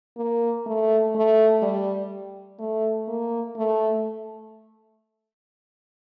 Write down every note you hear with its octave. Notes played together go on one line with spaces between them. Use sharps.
A#3
A3
A3
G3
A3
A#3
A3